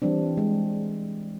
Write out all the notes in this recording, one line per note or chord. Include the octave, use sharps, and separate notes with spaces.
E3 G3 C4 D4
G#3